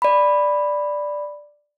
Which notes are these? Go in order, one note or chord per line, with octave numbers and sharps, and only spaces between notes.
D5 B5